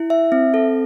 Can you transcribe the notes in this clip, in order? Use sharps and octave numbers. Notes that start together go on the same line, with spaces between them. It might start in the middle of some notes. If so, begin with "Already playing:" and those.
Already playing: E4
E5
C4
A4